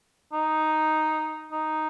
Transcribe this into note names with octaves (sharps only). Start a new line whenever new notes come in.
D#4
D#4